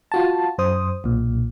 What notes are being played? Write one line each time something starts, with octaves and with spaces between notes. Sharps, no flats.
F4 F#4 A5
F#2 C5 D#6
B1 A#2